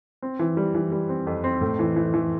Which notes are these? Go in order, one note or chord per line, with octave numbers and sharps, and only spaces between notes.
C4
E3
G3
E3
G3
C4
F2
C4
A2
E3
E3
E3